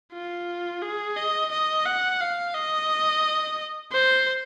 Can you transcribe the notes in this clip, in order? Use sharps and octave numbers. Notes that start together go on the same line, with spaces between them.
F4
G#4
D#5
D#5
F#5
F5
D#5
C5